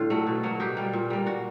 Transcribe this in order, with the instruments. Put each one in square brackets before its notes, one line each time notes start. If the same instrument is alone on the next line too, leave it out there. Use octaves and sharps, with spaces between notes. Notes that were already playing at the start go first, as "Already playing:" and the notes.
Already playing: [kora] A2 D3 F4
F#3 A3
B2
F#3 A#3
B2 G4
G3 A#3
A#2
G3 A#3
F#4